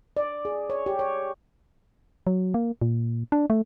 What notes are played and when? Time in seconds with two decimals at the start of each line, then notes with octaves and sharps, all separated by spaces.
0.17 D5
0.45 G#4
0.70 C#5
0.86 G4
0.99 C#5
2.27 F#3
2.54 A#3
2.82 A#2
3.32 D4
3.50 A3